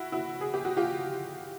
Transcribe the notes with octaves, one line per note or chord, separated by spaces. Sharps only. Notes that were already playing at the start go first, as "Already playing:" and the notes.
Already playing: E4 F#4
E4 F#4
G#4
G4
F#4
F4 G4